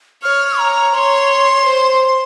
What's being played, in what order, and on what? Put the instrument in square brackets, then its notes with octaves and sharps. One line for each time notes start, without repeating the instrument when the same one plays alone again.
[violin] C#5 [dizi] F6
[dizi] A#5
[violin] C#5 [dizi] C6
[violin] C5